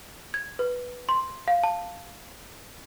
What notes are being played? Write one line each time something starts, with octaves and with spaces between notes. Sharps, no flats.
G#6
B4
C6
F5
A5